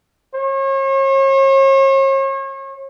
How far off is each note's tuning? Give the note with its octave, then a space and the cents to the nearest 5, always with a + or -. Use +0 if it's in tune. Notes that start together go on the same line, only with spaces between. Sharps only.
C#5 -40